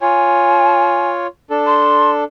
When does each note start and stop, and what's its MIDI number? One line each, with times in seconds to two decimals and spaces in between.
0.01 1.27 65
0.01 1.27 73
0.01 1.09 80
1.50 2.24 62
1.50 2.24 69
1.67 2.11 84